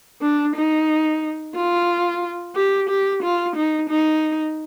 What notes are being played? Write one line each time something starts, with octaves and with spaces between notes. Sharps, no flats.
D4
D#4
F4
G4
G4
F4
D#4
D#4